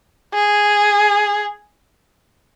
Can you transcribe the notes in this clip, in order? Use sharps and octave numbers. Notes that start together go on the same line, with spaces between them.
G#4